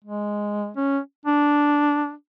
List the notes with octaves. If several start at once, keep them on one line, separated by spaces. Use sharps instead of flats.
G#3
C#4
D4